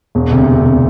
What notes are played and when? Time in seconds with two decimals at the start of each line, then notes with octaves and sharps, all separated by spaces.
0.15 E1
0.31 D2 C3
0.48 E1
0.65 C3